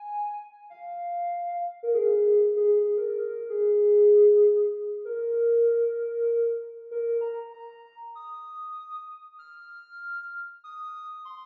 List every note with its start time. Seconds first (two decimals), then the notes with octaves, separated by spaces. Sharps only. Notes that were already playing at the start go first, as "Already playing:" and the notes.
Already playing: G#5
0.70 F5
1.83 A#4
1.95 G#4
2.56 G#4
2.76 G#4
2.97 A#4
3.18 A#4
3.49 G#4
5.05 A#4
6.91 A#4
7.21 A#5
7.52 A#5
8.15 D#6
9.39 F6
10.64 D#6
11.25 C6